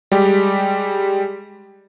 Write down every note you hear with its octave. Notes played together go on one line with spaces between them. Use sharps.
G3 G#3 G4